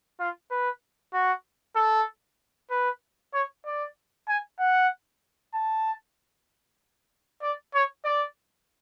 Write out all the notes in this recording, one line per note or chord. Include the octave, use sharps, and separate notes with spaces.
F4
B4
F#4
A4
B4
C#5
D5
G#5
F#5
A5
D5
C#5
D5